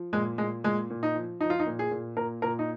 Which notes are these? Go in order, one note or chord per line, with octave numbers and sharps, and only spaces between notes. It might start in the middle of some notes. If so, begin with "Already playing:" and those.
Already playing: F3
A#2 G#3
A#2 G#3
A#2 G#3
A#2
D#4
F3
F3 D#4
F4
D#4
A#2
G#4
A#2
A#2 A#4
A#2 A#4
D#4